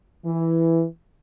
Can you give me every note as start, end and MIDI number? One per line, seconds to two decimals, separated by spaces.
0.25 0.84 52